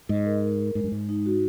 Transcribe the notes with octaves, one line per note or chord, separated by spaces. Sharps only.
G#2 D#5
A#4
A#4
A#4
G#2 G#3
G2
G#2 G#3
D#4
F#4